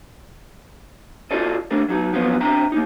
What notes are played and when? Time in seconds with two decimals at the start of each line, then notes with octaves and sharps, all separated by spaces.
1.31 F4 F#4 A4 D5 D#5
1.71 A3 D4 A#4
1.89 F#3 D#4 F#4
2.13 F3 F#3 B3 C#4 F4 F#4
2.41 C4 D4 E5 G5 A#5
2.72 A#3 D#4